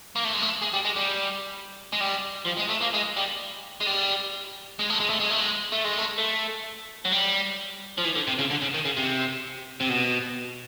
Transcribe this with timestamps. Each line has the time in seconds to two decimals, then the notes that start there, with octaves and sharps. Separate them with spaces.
0.16 A#3
0.25 A3
0.34 G#3
0.42 A3
0.62 G#3
0.73 G3
0.85 G#3
0.96 G3
1.93 G#3
2.01 G3
2.47 F3
2.59 G#3
2.70 A3
2.82 A#3
2.94 G#3
3.17 G3
3.81 G#3
3.87 G3
4.79 G#3
4.90 A3
5.00 G#3
5.10 A3
5.20 G#3
5.31 A3
5.40 G#3
5.72 A3
5.85 G#3
5.98 A3
6.18 A3
7.05 F#3
7.12 G3
7.98 F3
8.04 E3
8.15 D3
8.27 C3
8.39 C#3
8.50 D3
8.62 C#3
8.74 D#3
8.85 C#3
8.97 C3
9.80 C3
9.89 B2